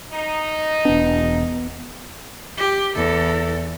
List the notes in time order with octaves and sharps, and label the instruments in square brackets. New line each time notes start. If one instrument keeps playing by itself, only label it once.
[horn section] D#4
[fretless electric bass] E1 D4 [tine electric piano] B3
[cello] G4
E2 A4